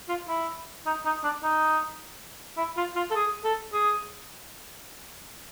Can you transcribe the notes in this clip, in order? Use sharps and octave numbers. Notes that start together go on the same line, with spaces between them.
F4
E4
D#4
D#4
D4
D#4
E4
F4
F4
A4
G#4
A4
G#4